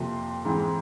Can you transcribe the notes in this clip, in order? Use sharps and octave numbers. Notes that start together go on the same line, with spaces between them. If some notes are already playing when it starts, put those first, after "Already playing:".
Already playing: F2 C3 F3 A#3 C6
G#2 E3 G#3 C4